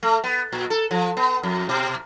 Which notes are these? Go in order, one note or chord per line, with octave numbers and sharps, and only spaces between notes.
A3
B3
A#2
A4
F3
B3
F2
B2